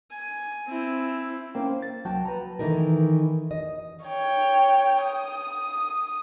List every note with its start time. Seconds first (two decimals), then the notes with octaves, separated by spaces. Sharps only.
0.11 G#5
0.68 C4 E4
1.55 A#3 C#4 C5 F5 G5
1.82 A6
2.05 C2 F#3 F#4 G5 A5
2.26 B4 A#5
2.59 D#3 E3 A3 D#4 A#4
3.51 D#5
4.05 C#5 G5
5.03 D#6